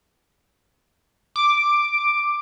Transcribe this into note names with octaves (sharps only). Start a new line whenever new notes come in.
D6